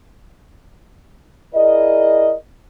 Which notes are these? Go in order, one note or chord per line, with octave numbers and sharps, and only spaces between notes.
E4 G#4 A#4 D5 D#5